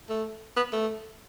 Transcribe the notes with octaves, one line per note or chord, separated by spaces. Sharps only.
A3
B3
A3